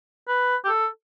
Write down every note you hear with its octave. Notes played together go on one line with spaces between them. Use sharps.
B4
G4
A4